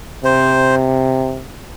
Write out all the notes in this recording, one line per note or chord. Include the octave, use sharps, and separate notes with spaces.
C3 C5